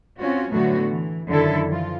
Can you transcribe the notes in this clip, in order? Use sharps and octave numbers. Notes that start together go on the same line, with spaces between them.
C4 C#4 F4 F#4
A2 D3 F#3 A3 B3 F#4
E3
F#2 D3 D#3 E4 A4
E3 F3 F4